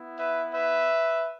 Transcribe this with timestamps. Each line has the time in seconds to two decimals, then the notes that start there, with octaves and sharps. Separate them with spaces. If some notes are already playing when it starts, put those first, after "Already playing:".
Already playing: B3 E4
0.18 B4 E5
0.54 B4 E5